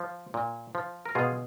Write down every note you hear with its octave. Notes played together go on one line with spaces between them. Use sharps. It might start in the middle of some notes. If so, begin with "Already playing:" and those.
Already playing: F3
A#2
F3
A#4
B2 F4 G#4